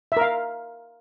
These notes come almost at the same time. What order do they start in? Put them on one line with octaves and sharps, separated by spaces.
E5 A#4 F5